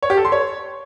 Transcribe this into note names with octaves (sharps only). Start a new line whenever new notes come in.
C#5
G4
A4
C6
C#5